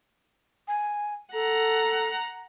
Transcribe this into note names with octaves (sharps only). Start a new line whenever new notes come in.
G#5
A4 F#5 A#5